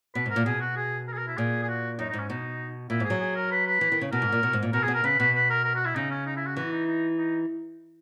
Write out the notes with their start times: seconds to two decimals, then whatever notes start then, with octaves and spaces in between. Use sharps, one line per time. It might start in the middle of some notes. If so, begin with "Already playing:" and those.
0.15 B2 B4
0.26 G#2 A#4
0.36 A#2
0.46 B2 G#4
0.61 F#4
0.76 G#4
1.07 A#4
1.13 G#4
1.18 A#4
1.27 E4
1.37 A#2 G#4
1.63 G#4
1.69 F#4
1.98 F#2 D#4
2.09 D#4
2.13 G#2 C#4
2.29 B2 D#4
2.90 A#2 E4
3.00 G#2 G#4
3.10 F#3
3.21 G#4
3.36 A#4
3.51 B4
3.66 B4
3.81 E3
3.92 D#3
4.01 C#3
4.12 B2 A#4
4.22 G#2
4.32 A#2
4.43 B2
4.53 G#2
4.63 A#2
4.73 B2 A#4
4.83 G#4
4.88 B2
4.94 A#4
5.04 C#3 B4
5.19 B2 B4
5.35 B4
5.50 A#4
5.64 A#4
5.75 F#4
5.85 E4
5.96 C#3 D#4
6.11 C#4
6.26 D#4
6.36 E4
6.46 F#4
6.56 E3 F#4
6.72 D#4
6.86 D#4
7.17 D#4